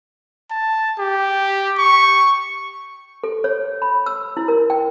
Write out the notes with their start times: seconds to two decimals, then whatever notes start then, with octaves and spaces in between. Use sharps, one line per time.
0.50 A5
0.99 G4
1.78 C#6
3.24 A4
3.44 C#5
3.82 B5
4.06 E6
4.37 E4
4.48 A#4
4.70 G5